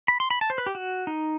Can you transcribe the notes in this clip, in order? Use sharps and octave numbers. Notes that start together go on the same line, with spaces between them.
B5
C6
B5
A5
C5
B4
G4
F#4
D#4